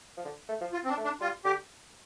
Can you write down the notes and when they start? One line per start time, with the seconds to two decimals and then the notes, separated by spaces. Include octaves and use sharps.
0.17 F3
0.25 D3
0.49 A3
0.61 F3
0.73 F4
0.84 C4
0.89 D4
0.97 A3
1.04 D4
1.21 G3 F4
1.45 D3 G4